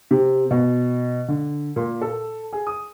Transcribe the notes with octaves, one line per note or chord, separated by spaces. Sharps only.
C3
B2
D3
A#2
A4
G#4
D#6